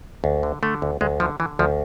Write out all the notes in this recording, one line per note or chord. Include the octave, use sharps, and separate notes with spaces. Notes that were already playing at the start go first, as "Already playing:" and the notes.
D2
D3
D3 A3
D2
D2 G#3
D3 F3
D3 E3
D2 F3